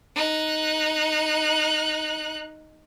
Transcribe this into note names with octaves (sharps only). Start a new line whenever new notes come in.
D#4 F#6